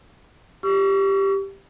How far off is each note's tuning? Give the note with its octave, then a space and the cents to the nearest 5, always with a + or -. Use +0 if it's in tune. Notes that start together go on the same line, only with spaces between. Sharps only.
G4 +0 C#6 +35 E6 +45